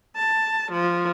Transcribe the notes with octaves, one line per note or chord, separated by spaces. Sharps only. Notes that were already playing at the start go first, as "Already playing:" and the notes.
A5
F3